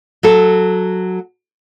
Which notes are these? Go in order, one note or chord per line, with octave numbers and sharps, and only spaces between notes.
F#3 A4